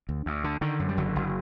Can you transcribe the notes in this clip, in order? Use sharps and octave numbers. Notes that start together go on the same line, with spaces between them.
D2
D2
D3
D3 D#3
F#2
G3
F#1 D3 F#3
F#1